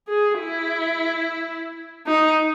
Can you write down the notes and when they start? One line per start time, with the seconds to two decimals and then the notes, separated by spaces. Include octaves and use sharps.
0.08 G#4
0.40 E4
2.07 D#4